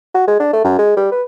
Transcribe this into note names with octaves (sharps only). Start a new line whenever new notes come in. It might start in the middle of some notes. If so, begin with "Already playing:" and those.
F#4
G#3
D4
A3
F#2
G#3
G3
B4